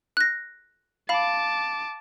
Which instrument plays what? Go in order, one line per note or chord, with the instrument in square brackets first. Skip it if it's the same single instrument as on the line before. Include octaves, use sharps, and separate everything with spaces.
[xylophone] F#6 A#6
[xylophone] F5 B5 [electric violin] A5 D6